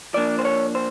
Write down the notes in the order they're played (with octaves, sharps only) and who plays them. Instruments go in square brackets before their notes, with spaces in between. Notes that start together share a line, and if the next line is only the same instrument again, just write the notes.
[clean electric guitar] F3 A#3 D4 D5
C5
C#5
C5